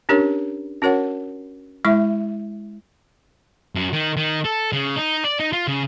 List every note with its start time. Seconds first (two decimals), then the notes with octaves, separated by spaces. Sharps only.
0.09 C#4 D4 G4 A#4 C#5
0.82 C#4 F#4 A#4 C#5 F#5
1.85 G#3 E4 E5 C#6
3.75 F#2
3.93 D#3
4.17 D#3
4.45 A4
4.73 C#3
4.96 D#4
5.24 D5
5.39 D#4
5.53 F4
5.67 C#3